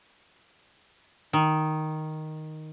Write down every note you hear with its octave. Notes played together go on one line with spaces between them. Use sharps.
D#3